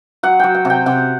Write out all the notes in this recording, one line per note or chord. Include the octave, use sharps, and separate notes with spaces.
F#3 F#5
F#3 G5
F#5
C3 G5
C3 F#5